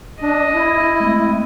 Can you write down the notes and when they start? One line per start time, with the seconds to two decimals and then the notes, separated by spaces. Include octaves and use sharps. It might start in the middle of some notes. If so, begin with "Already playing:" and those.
0.22 D4 D#5
0.54 E4
1.00 G#3 A3 C4